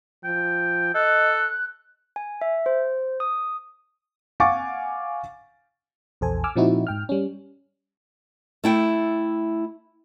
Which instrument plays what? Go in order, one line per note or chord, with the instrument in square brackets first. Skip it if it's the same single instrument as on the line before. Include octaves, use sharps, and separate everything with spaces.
[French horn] F3 [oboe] G5
[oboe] A4 [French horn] D#5 [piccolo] F#6
[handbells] G#5
E5
C5
D#6
[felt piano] F5 F#5 G#5 C#6 D6 A6
[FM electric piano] A#1 E2 A4 C5 G#5
G#5 D6 E6 F6
A#2 F3 C4 D#4 E4 F#4
G#2 G5 F6
G3 C#4
[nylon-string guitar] A3 E4 G5